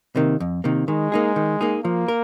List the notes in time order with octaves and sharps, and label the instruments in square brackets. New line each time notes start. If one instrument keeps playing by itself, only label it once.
[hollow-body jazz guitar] C3 D#3 A#3
F2
C3 D#3 A#3
[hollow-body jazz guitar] D#3 [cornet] G#3
[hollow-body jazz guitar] A#3 D#4 G#4
D#3
A#3 D#4 G#4
[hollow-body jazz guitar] F3 [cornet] A#3
[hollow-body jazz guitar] A#4